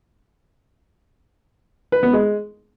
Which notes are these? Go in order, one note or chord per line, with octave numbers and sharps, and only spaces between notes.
B4
B3
G#3